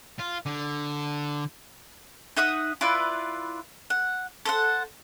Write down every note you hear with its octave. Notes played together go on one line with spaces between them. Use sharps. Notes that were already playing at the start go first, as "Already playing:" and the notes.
F4
D3
D#4 E5 F#5 D#6
E4 F4 B4 D5
F#5
A4 C5 F#5